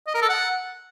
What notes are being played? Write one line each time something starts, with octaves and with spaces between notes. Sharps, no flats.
D#5
A#4
A4
F#5